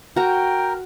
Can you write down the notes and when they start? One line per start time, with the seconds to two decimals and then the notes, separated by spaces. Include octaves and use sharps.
0.16 F#4 A#4 G5 A#5